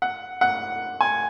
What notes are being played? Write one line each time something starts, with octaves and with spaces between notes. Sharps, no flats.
F#5
F#5
G#5